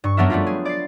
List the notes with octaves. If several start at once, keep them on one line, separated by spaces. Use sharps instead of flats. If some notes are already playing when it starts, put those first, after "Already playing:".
G2 C#6
F#2 F#3 B3 D4 A#4 E5
G3 A3 B3 F4 G4
G#4
D5 A6 C7